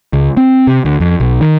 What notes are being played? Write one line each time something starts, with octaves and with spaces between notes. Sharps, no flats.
C#2
C4
C3
D2
F2
B1
D#3